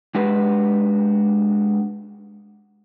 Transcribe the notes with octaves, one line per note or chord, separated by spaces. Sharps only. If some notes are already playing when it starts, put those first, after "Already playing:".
G#3 D4 F#4 G4 B4